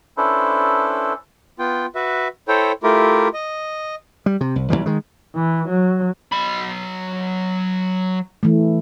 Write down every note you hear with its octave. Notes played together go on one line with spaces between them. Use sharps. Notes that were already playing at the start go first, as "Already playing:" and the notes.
C#4 D4 E4 A4 B4 C5
B3 F4 G5
F#4 B4 E5
E4 A4 C5 C#5 G5
A3 E4 F4 G4 A#4
D#5
G3
C3
C2
B1 E2 E3 G3
D#3 G#3
E3
F#3
F#3 B5
E3 A3